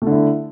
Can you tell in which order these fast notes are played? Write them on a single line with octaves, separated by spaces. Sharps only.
A3 D3 E4